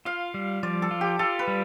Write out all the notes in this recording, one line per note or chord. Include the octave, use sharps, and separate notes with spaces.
F4 F5
G3
F3 D5
A4
F4
G4
F4 A4
B4
G3